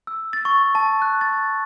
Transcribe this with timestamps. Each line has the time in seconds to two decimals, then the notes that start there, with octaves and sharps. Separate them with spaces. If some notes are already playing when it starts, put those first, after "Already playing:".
0.07 E6
0.33 A6
0.45 C#6
0.75 A5
1.02 F#6
1.21 A6